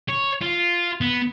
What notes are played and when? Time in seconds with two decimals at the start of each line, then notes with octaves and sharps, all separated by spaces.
0.08 C#5
0.42 F4
1.01 B3